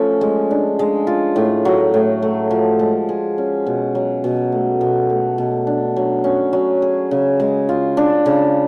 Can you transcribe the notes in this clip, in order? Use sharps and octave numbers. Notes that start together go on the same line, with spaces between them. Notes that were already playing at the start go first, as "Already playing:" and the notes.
Already playing: F3 A3 C#4
G#3
D4
G#3
F4
A2
F#3
A2
A3
F3
G#3
G#4
C#4
B2
F#3
B2
A3
B2
A3
B2
D4
F#3
C#4
F#3
G#4
C#3
G#3
F4
D4
C#3